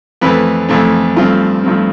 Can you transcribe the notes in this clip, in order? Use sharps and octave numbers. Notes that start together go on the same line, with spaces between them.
F2 E3 A3 C4 B4
F2 E3 A3 C4
G2 F3 A3 C4 F4
G2 F3 A3 C4